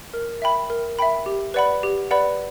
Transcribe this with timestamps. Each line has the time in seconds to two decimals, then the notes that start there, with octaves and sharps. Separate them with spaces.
0.14 A#4
0.42 E5 G5 B5
0.70 A#4
0.99 E5 G5 B5
1.26 G4
1.54 B4 D5 F#5 B5
1.83 G4
2.11 B4 D5 F#5 B5